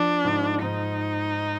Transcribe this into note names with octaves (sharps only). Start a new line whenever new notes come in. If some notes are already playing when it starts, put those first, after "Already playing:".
Already playing: F3 D4
G#2
G#2 D#4